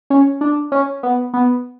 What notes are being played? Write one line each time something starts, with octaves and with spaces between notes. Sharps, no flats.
C#4
D4
C#4
B3
B3